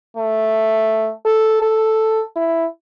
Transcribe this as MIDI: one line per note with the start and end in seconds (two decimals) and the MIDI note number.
0.17 1.11 57
1.26 1.59 69
1.62 2.22 69
2.36 2.66 64